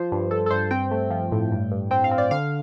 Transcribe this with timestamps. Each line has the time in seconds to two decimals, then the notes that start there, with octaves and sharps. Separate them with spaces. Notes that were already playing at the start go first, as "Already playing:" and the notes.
Already playing: F3 C5
0.12 G2
0.31 G2 A4
0.46 A4
0.51 G2 C5
0.71 C4 G5
0.91 A3
1.11 F3
1.32 A2
1.52 G2
1.72 G2
1.91 C4 G5
2.04 F5
2.11 C4
2.18 D5
2.31 D3 F5